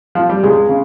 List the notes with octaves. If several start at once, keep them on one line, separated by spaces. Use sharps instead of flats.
F3
G3
C#2 G#3
C#3